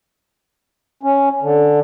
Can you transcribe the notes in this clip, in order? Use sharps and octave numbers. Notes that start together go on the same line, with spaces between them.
C#4
D3